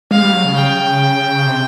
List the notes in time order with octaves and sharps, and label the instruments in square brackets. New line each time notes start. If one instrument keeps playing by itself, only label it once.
[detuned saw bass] G#3 [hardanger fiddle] F5
[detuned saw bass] G3
F#3
C#3
[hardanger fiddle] G5
[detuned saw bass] C3